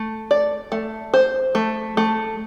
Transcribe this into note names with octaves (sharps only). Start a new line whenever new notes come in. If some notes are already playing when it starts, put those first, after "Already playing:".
Already playing: A3
D5
A3
C5
A3
A3